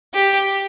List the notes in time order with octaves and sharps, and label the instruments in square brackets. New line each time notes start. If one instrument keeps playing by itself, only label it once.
[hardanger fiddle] G4